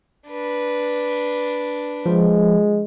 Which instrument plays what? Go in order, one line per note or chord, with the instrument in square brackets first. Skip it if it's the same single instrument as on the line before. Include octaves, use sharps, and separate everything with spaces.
[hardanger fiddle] D4 B4
[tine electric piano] F3 [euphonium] G#3